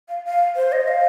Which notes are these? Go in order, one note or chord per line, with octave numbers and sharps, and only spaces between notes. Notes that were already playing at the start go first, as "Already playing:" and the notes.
F5
F5
C5
D#5
F5